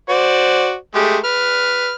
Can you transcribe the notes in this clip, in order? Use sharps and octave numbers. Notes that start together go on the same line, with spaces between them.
F#4 C5 D5
G#3 A3 G4
B4 F6